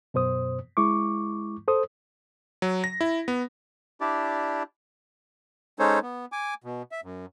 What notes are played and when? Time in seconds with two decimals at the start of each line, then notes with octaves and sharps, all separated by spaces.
0.14 F#2 B2 C5 D#6
0.77 G#3 E4 C#6 D6
1.68 A4 C5 D#6
2.62 F#3
2.84 A#6
3.01 E4
3.28 B3
4.01 D4 E4 G4 D5
5.79 G#3 C#4 D#4 A4 C5 C#5
6.03 B3
6.32 G#5 D6
6.64 B2
6.92 E5
7.04 F#2